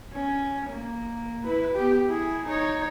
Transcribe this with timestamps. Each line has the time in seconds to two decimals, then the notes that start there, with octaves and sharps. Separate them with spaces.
0.13 C#4
0.70 A#3
1.44 E4 B4
1.74 B3 G4
2.06 E4 G#4
2.46 D#4 C#5